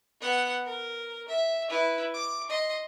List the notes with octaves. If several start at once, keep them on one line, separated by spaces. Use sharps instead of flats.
B3 F#5
A#4
E5
E4 B4
D6
D#5 C6